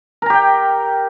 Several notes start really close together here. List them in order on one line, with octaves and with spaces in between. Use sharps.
A#4 A#5 G4 G5